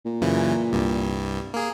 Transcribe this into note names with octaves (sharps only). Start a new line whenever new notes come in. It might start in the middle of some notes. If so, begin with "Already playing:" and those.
A#2
F#2 C#3 E3
C2 G2
A#3 G#4